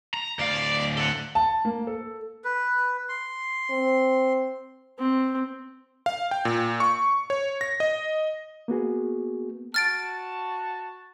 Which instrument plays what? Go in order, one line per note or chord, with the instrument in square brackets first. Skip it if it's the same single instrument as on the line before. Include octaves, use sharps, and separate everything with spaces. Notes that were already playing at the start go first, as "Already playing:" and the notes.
[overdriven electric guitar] A#5
[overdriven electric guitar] D2 F5 [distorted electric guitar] D5
[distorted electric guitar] D5
A4 F#5
[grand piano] A5
A#3
A4
[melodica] B4
C6
[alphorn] C4
[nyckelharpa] C4
[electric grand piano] F5
G5
A#2
C#6
C#5
A#6
D#5
[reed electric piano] A#3 B3 F#4 G#4
[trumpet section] F#4 A5 [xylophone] F6 A6 D7